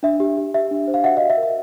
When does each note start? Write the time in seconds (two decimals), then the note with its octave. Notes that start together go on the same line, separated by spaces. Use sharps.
0.03 D4 E5
0.20 G4
0.37 G4
0.54 G4 E5
0.71 D4
0.87 C5
0.94 F5
1.04 F#4 E5 F#5
1.17 D#5 F5
1.22 F#4
1.30 E5
1.37 A#4
1.43 E5